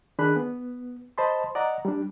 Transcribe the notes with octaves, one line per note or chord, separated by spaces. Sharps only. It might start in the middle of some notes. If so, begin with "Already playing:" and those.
D#3 D4 G#4 B5 F#6
B3
C5 D#5 A5 B5 C6
D5 D#5 F#5 A#5
G3 D4